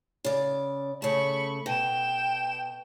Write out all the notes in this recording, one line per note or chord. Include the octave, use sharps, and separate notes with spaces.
C#3 D5
C#3 A3 B5 C#6
B2 G5 E7